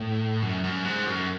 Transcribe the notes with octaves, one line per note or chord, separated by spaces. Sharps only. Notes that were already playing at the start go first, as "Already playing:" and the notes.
Already playing: A2
F#2
F#2
G#2
F#2